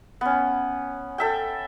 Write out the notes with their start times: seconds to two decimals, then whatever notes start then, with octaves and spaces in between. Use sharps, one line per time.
0.21 B3 C#4
1.18 A4 E5 G5